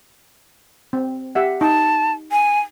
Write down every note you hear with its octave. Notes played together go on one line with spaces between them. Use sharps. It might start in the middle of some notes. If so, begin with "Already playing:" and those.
C4
G4 E5 F#5
D#4 A5
G#5